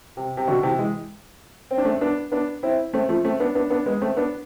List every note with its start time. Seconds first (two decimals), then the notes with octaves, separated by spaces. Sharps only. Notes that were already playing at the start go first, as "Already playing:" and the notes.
0.17 C3
0.37 C3
0.47 B2 D3
0.63 C3 E3
0.78 E3 G#3
1.71 C4
1.78 D4
1.85 A3 C4
2.01 B3 D4
2.32 B3 D4
2.63 C4 E4
2.93 A3 C4
3.09 F3 A3
3.25 A3 C4
3.40 B3 D4
3.55 B3 D4
3.70 B3 D4
3.86 G#3 B3
4.01 A3 C4
4.17 B3 D4